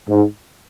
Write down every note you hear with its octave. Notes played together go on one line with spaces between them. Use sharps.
G#2